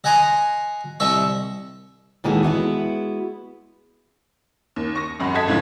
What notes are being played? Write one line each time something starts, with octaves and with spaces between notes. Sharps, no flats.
D#5 F#5 G#5 A#5 C6
C2 D#5 E5 C#6
A#2 D#3 E3 G#3 F#4 A4
G#3 B3 E4 F#4
D#2
C#6 A#6
G#1 F#2 F#5 B5
A4 D#5 A5 G#6 B6
F1 C#2 A2 D3 F3 G#6